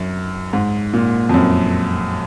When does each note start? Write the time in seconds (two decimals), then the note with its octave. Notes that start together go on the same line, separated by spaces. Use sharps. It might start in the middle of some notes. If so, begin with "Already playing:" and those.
Already playing: F#2
0.53 G#2
0.93 A#2
1.29 F2
1.34 F#2